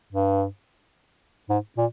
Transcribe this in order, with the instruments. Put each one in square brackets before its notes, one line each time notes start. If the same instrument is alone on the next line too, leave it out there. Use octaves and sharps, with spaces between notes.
[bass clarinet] G2
G#2
A#2